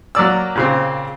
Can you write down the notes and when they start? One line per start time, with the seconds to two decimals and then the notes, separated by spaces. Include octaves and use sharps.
0.15 F#3 A#3 D5 E6
0.55 A#2 C#3 C4